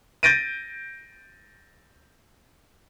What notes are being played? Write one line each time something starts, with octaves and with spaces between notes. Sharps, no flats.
G6 A6 A#6 D7 D#7